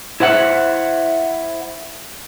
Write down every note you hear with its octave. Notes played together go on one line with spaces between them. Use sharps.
E4 C5 E5 F#5